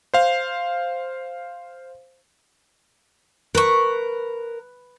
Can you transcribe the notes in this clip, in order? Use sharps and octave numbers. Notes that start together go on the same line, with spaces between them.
C5 F5
A#4 B4 C#6